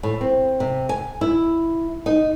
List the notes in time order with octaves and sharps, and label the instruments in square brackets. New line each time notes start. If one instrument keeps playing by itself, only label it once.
[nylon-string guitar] A2
C4
C3
G#5
E4
D#4